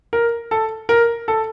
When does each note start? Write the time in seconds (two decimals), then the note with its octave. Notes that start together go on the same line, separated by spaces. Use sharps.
0.13 A#4
0.51 A4
0.89 A#4
1.28 A4